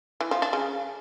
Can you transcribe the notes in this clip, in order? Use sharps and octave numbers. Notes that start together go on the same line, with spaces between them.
E3
F3
D4
C#3